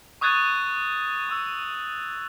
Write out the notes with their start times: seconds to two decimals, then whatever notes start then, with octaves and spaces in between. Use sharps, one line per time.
0.21 C#6 D#6 F#6 G#6 A6 D#7
1.29 C#6 E6